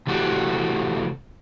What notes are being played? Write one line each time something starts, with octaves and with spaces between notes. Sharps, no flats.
C3 E3 A3 F#4 G4